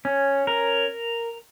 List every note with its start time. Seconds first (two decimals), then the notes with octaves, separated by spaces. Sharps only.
0.05 C#4
0.47 A#4